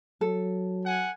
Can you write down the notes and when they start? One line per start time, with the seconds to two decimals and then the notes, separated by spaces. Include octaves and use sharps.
0.21 F#3 A4
0.84 F#5 G#5